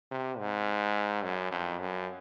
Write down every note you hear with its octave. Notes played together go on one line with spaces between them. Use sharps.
C3
G#2
F#2
F2
F#2